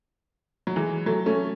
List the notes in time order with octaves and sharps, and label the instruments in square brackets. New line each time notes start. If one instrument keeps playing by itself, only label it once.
[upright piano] F#3
E3 G#3
F#3 A3
A3 C#4